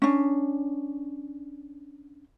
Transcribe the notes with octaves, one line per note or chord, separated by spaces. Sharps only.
C#4 D4